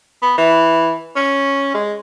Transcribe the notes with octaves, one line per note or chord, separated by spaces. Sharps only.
B3
E3
C#4
G#3